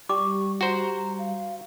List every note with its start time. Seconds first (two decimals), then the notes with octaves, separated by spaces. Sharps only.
0.09 G3 C#6 D6
0.61 F#4 C5 A#5
1.19 F5